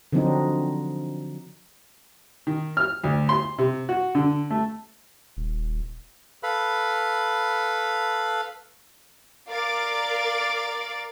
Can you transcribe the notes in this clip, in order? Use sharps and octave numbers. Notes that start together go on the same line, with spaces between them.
D3 F3 F#3 C4 D4 D#4
D#3
F6
D2
C6
C3
F#4
D3
A3
D#1
A4 B4 F5 B5
A#4 D5 F5 D6 A6